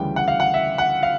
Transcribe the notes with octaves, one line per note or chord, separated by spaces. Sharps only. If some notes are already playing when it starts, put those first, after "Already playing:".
Already playing: D2 C#3 E3 G3 G5
F#5
F5
F#5
E5
F#5
F5